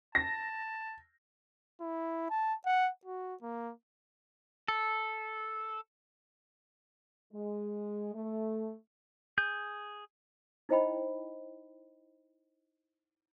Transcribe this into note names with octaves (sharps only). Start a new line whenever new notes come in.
A5 A#6
E4
A5
F#5
F#4
A#3
A4
G#3
A3
G#4 G6
D#4 E4 C5 D#5 G5 B5